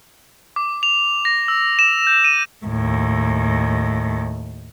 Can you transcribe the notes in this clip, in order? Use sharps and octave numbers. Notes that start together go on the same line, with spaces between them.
D6
F7
A#6
E6
E7
G6
D#7
D#2 A2